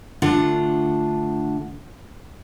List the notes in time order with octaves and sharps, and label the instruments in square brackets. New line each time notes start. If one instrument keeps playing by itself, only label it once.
[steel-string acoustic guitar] D3 A3 D4 F4 F#5